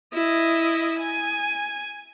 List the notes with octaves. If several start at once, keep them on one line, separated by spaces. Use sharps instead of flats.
E4 D#5
G#5